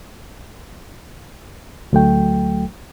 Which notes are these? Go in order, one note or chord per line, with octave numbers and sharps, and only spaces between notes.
D2 F#3 A3 G5